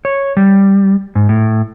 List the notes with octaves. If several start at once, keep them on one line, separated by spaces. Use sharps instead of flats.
C#5
G3
G#2
A2